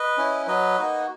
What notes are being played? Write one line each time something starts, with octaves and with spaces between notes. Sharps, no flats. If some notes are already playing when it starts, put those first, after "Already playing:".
Already playing: B4 D#5
C#4 E4
F#3 B4 D#5
A#3 D#4 F#4